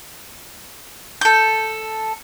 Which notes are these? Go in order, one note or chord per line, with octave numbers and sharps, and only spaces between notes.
A4 G6